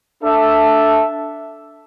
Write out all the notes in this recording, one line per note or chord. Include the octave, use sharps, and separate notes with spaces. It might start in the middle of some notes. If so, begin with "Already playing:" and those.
D4 A4 E5